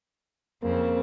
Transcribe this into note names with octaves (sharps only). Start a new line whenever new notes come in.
F2 C#3 A#3 C4